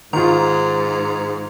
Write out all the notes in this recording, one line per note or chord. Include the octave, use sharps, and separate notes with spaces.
G#2 D#3 F4 A#5